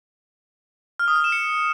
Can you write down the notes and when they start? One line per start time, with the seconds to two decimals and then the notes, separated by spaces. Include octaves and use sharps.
0.99 F6
1.08 D#6
1.16 F6
1.24 E7
1.32 C#7